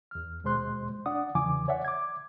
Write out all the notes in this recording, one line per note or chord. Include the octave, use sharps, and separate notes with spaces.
E2 F6
D#2 B2 G#3 C5 C6 F#6
D4 D5 F#5 D#6
E2 C#3 E3 G#5 D6
C#5 D5 E5 F#5
D6 G#6